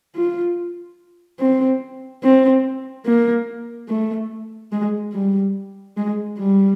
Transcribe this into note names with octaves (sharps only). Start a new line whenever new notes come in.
F4
C4
C4
A#3
A3
G#3
G3
G#3
G3